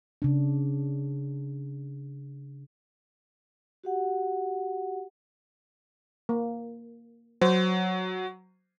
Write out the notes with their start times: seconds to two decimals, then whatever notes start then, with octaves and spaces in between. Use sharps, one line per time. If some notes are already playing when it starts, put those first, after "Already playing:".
0.22 C#3 D4
3.84 F#4 G4 F#5
6.29 A#3
7.41 F#3 C5